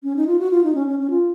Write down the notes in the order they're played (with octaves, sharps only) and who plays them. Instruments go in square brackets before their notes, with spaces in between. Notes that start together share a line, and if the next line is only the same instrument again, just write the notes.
[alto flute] C#4
D#4
F4
F#4
F4
D#4
C#4
C#4
C#4
F4